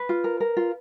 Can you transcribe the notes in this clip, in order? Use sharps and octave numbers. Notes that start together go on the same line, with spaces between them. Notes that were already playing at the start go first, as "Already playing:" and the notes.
Already playing: B4
F4
A#4
A#4
F4